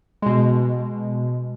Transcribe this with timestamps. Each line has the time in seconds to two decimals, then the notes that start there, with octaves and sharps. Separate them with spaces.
0.22 B2 G#3